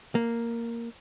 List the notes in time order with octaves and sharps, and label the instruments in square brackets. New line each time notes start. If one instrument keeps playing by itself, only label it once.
[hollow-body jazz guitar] A#3